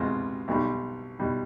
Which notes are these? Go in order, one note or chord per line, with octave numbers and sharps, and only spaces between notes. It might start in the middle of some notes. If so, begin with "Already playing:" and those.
Already playing: C2 B2 G#3 C4 F4
B1 B2 G3
B2 G3